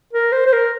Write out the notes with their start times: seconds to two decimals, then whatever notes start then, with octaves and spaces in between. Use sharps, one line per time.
0.13 A#4
0.32 C5
0.46 C5
0.53 A#4